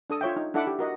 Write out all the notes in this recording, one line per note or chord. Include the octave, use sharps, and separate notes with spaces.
D4 A4 D#6
F4 C#5 E5 G5
D#4
D4 E4 A4 E5 F#5 D6
G4
F#4 A#4 D#5 F#5